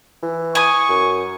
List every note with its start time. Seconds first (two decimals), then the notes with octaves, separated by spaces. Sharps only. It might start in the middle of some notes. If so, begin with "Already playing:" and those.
0.23 E3
0.55 G#5 C#6 D#6
0.89 F#2